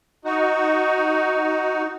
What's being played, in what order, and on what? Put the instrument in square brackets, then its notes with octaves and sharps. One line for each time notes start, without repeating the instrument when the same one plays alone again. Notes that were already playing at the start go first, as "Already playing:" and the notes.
[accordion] D#4 F#4